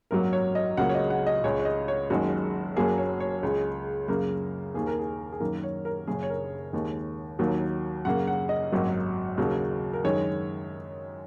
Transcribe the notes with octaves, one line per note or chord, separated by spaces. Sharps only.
G#1 F#2 F#3 A#3 A#4
C#5
D#5
C#2 C#3 F#3 A#3 F#5
C#5
D#5
F#5
D#5
C#2 C#3 G#3 C#5
C#5
D#5
C#5
F#1 F#2 D#3 G#3 F#4
F#1 F#2 F#3 A#3 G#4
C#5
C#5
C#2 C#3 G#3
F#2 C#3 A#3 A#4
D#2 D#3 A#3 G#4
A#4
G#4
G#4
F#2 D#3 A#3 A#4
C#5
A#4
F#1 F#2 C#3 G#4
C#5
A#4
D#2 D#3 G#3
D#2 D#3 F#3 A#3
F#2 C#3 A#3 F#5
F#5
D#5
G#1 F#2 F#3 A#3
D#2 C#3 F#3 A#3
A#4
F#2 D#3 G#3 C#5